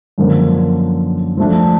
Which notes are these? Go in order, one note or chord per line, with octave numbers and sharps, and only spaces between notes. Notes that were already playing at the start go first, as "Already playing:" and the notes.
F#2 D3 F3 A#3
F3 A3 D4